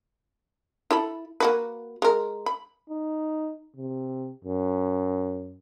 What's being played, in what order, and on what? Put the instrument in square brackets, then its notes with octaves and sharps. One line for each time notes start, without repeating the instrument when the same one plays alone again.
[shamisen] E4 A4 B5
A#3 F#4 B4
G#3 A#4
B5
[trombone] D#4
C3
F#2